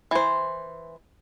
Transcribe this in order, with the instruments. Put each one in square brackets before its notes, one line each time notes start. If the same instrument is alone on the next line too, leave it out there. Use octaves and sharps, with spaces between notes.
[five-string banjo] E3 C5